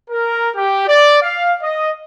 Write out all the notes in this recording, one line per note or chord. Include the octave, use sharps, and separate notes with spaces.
A#4
G4
D5
F5
D#5